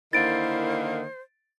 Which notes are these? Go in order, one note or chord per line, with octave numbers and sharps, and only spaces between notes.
D3 D#3 A#3 E4 C5 A6 D7